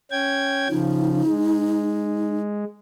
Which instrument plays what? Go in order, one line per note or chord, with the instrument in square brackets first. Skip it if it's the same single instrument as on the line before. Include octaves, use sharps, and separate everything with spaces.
[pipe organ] C#4 G5 G#6
[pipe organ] C#3 F3 [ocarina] D#4
[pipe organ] G#3